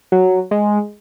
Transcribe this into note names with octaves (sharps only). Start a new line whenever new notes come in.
F#3
G#3